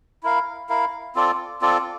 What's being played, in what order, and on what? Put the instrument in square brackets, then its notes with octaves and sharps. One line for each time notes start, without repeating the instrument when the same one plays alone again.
[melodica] E4 A#4 F5
E4 A#4 F5
C4 F4 A4 D5
C4 F4 A4 D5